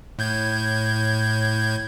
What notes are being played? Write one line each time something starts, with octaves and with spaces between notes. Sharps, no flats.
A2 G6 G#6